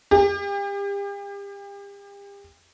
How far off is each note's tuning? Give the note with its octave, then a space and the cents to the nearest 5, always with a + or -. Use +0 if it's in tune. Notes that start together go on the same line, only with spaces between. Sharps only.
G4 +35